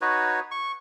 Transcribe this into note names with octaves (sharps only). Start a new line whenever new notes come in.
D#4 F#4 B4 C#5
C#6